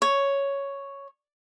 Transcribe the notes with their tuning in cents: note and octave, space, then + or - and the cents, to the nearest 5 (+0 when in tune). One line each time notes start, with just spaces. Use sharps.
C#5 +0